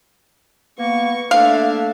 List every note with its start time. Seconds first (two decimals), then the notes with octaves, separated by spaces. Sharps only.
0.79 A#3 B3 C#6
1.31 A3 A#3 D4 E5 F5